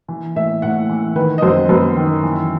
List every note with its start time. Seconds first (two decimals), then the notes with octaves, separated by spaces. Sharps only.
0.08 E3
0.35 A2 E5
0.62 A2 F#5
0.89 E3
1.15 D#3 B4
1.38 D#5
1.42 F#2 C5
1.69 F#2 B4
1.97 D#3
2.23 E3